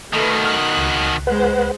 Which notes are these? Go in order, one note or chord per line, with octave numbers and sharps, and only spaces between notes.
B2 D#3 A3 B4
F6 F#6
C#2
G#3 B4 C5 F#5